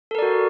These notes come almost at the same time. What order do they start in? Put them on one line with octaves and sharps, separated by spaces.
A4 A#4 D5 F#4